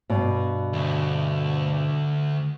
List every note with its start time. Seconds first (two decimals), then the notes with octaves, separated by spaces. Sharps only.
0.10 G2 B2
0.73 D2